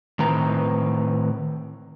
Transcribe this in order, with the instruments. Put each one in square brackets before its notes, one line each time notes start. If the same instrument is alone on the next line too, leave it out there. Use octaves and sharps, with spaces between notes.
[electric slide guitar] A2 D#3 C4 B4 A#5